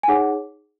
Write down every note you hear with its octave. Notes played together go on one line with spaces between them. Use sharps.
G#5
D#4 G#4 C#5 F#5